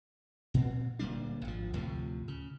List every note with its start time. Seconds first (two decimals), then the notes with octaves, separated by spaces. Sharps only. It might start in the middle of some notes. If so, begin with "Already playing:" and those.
0.54 A#2 C4
0.99 D1 A#2 G3 D4
1.45 G#1 F3
1.73 D2 A2 C3 F3
2.28 C#3